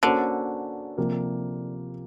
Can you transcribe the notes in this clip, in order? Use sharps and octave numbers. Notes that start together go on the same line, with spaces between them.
D3 A#3 C#4 F#4 A4 C5
C3 F3 A#3